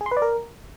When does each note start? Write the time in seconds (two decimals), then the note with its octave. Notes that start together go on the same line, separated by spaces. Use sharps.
0.01 G#4
0.06 C6
0.11 B4
0.17 D5
0.22 A#4